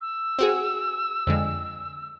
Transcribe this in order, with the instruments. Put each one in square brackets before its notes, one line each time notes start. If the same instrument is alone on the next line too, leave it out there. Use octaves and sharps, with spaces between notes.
[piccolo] E6
[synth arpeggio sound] C4 F#4 G#4
F2 D3 G#3